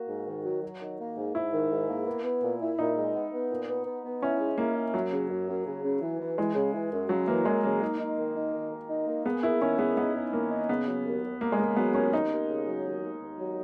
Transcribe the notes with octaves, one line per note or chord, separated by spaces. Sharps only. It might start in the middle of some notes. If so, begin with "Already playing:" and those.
Already playing: A#3 F#4
G#2
D#3
F#3
F#3
D#3
A#3
G#2
G#2 E4
D#3
G#2
A#3
B3
B3
A#2
E4
A#2 D#4
G#3
B3
B3
A#2
B3
B3
B3
C#4 E4
G#3
A#3 E4
E4
F#2 F#3
C#3
F#2
F#2
C#3
C#3
E3
E3
E3 G#3
C#3
E3
F#2
C#3 F#3
E3 A#3
F#2 G#3
C#3 A#3
D#4
D#4
D#3
D#4
D#3
D#3
D#4
A#3
B3 G#4
A#3 E4
D#3 C#4
B3 G#4
B3 D#4
D#4
D#3 A#3
D#4
C#3 B3
F#3
D#2
D#2
D#2 A#3
G#3
C#3 A#3
F#3 B3
D#2 C#4
D#2 D#4
D#2
C#3
F#3
D#2
D#2
D#2
F#3